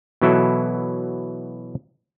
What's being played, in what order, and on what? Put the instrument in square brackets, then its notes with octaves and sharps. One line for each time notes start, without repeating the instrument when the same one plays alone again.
[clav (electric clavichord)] B2 E3 F#3 E4 A4